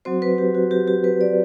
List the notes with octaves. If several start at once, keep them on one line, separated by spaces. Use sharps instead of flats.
F#3 C4 F#4 C5
B4
G4
F#4
G4
G4
B4
D5